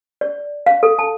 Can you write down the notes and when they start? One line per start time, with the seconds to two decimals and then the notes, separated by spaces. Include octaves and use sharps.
0.21 D5
0.66 F5
0.83 A4
0.99 A5